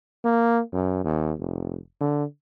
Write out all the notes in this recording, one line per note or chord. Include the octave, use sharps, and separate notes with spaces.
A#3
F#2
D#2
F1
D3